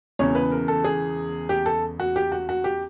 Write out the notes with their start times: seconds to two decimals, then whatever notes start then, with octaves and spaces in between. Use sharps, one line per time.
0.19 E1 E2 C#3 C#5
0.35 B4
0.52 A#4
0.68 A4
0.85 G#4
1.49 G4
1.66 A4
2.00 F#4
2.16 G4
2.32 F#4
2.49 F#4
2.64 G4